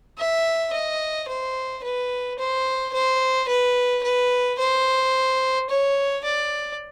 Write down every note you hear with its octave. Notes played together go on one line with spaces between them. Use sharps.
E5
D#5
C5
B4
C5
C5
B4
B4
C5
C#5
D5